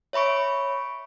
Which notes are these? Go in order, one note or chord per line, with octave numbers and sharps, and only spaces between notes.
C#5 E5 B5 C#6 D7